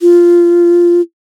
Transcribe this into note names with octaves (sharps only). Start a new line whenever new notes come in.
F4